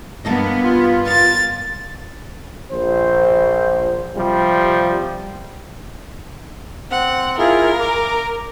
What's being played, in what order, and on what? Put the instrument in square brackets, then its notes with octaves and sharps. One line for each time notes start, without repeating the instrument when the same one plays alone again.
[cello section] G2 B3 [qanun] A#3 A4 D#5
[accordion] F4
[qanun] A#4 F5 [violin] A6
[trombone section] A#1 C5
C3 F3 G3
[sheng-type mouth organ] C4 [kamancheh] F#5
[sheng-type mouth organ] E4 F4 G#4 [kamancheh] A#4
[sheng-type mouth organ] A#5 D6